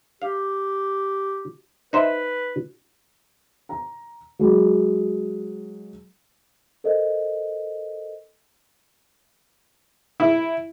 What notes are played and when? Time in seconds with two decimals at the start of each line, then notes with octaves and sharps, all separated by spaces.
0.22 G4 F5
1.93 D#4 B4 C5 E5
3.69 A#5
4.39 F#3 G#3
6.84 A4 A#4 C5 D#5
10.20 E4